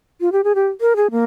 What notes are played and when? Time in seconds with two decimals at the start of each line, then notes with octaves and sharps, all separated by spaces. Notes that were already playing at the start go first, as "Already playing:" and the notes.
0.21 F4
0.32 G4
0.44 G#4
0.55 G4
0.81 A#4
0.96 G#4
1.11 A#3